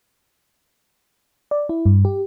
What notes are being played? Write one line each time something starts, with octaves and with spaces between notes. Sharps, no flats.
D5
E4
G2
G4